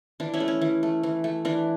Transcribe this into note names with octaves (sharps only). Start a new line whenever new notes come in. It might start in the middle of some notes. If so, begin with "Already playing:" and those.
E3 D4
C#4 E4
A3
C#4
E3
A3
E3
A3
E3 D4